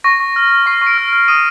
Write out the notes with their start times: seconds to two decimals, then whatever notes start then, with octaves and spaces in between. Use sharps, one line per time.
0.04 C#6 A#6
0.20 C#6
0.36 F6
0.51 F6
0.66 C#6 C7
0.81 C#6
0.87 D7
0.98 F6
1.08 D7
1.13 F6
1.28 D#6 D#7